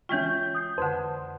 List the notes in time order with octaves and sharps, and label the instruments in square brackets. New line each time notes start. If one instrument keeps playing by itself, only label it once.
[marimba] E3 G#3 F4 [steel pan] C#4 G5 [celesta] C#6 G6
[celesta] D#6 G6 C7
[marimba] F2 D3 [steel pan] B4 C5 [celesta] F#5 A5 C6